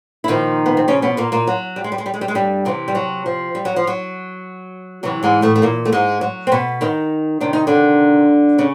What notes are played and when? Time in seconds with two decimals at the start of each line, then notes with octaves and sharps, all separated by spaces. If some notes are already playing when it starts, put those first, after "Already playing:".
0.24 E4
0.28 A#2 D#3 F3 D#4
0.66 B3
0.77 C4
0.88 C#3 C#4
1.02 B2 B3
1.17 A#2 A#3
1.32 A#2 A#3
1.47 F#3
1.76 G3
1.84 G#3
1.92 G3
1.98 G#3
2.06 G3
2.14 G#3
2.21 G3
2.28 G#3
2.35 G2 G3
2.65 C3 E3 F#3
2.88 G3
2.95 F#3
3.26 F3
3.55 G3
3.65 F#3
3.76 F3
3.87 F#3
5.03 C3 E3 F#3
5.23 G#2 G#3
5.42 A2 A3
5.56 A3
5.62 A#2 A#3
5.85 A3
5.92 G#2 G#3
6.21 F#3
6.47 C4
6.52 B2 B3
6.81 D#3 D#4
7.41 C3 D#3 D4
7.53 D#4
7.67 D3 D4
8.58 C#3 C#4